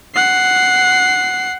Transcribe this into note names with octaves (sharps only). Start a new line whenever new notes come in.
F#5 C7